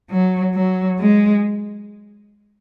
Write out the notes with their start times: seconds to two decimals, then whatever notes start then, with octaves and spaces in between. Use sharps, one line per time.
0.10 F#3
0.54 F#3
1.00 G#3